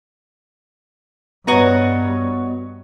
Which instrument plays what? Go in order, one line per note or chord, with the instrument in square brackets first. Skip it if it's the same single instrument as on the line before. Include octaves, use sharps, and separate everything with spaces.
[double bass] G2 [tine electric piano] B3 [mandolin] F#4 D#5 A#5 [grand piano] B4 C#5